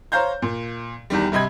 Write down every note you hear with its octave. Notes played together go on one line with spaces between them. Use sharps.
C5 C#5 F5 A#5 G6
A#2
E2 D#3 G3
G2 C3 D#5 B5 G#6